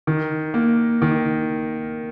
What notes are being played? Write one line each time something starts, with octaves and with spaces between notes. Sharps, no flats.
D#3
A#3
D#3